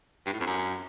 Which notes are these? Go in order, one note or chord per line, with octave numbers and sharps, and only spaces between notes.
G2
A2
F2
F#2